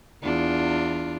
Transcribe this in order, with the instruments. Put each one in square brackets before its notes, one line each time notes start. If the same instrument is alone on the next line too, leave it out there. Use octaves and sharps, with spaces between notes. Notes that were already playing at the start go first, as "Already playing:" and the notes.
[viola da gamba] E2 D4 F4